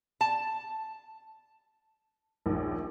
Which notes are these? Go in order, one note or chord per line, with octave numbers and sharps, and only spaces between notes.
A5
A#1 D#2